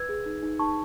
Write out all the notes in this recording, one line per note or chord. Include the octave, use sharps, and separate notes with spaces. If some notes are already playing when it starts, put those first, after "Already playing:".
Already playing: B4 E6 G#6
G#4
D#4
D#4
D#4 A5 C#6